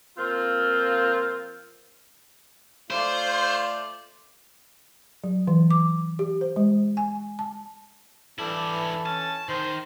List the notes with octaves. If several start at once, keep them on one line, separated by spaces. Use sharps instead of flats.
F3 A#3 C4 F4
A3 F4 C5 D5
F#3
E3
D6
G4
C5
G#3
G#5
A5
E3 G3 D4 E4 A4
C#4 A5
D#3 C5